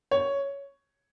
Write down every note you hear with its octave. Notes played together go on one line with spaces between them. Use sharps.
C#5